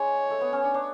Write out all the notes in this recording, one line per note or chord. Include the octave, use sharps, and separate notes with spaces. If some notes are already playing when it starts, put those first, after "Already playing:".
Already playing: G#3 D4 C#5
A3
B3
C#4
D4
D4